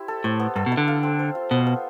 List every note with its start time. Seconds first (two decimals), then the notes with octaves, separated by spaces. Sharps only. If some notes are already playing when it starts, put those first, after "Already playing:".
Already playing: C4 E4 G4
0.08 A4
0.24 A2 C5
0.40 B3
0.56 G2 A4
0.66 B2
0.72 E4
0.77 D3
0.88 F5
1.03 C4
1.19 C5
1.35 F4
1.51 B2 C5
1.67 B3